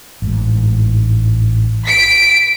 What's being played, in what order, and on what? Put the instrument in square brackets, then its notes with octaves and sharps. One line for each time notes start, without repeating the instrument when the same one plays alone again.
[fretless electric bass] A1 G#2
[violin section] B6 D7